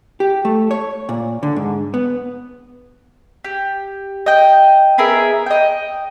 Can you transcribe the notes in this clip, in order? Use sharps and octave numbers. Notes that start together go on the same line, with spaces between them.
G4
A3
C#5
A#2
D3
G#2
B3
G4
D#5 G5
B3 G#4 A#4 E5
D#5 G5